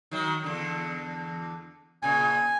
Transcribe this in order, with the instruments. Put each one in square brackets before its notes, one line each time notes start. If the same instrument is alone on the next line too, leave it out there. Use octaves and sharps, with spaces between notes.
[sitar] D#3 F#3
E2 D3
[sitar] A#2 C#3 [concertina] G#5